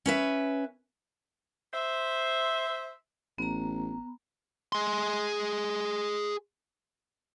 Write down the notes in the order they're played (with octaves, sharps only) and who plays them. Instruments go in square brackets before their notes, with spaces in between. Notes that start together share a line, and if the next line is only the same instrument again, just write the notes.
[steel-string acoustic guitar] C#4 B4 E5
[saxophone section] C5 E5
[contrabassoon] A1 [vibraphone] B3 A#5
[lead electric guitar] G#4 C6